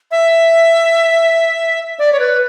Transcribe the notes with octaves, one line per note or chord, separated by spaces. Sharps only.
E5
D5
C#5
B4